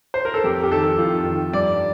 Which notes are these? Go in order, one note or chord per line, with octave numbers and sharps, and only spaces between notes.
C5
A#4
A4
F2 G4
G4
D#3 A4
F2 F4
D#3
G2 D5